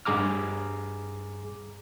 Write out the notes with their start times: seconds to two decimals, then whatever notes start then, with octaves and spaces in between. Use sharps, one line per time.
0.05 G2 G#4 A#5 D6 F6